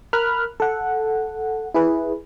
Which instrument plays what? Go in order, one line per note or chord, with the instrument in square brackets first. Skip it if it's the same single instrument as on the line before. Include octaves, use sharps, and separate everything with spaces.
[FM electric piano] A#4 B5 F6 F#6
A4 F#5
E4 G#4 B4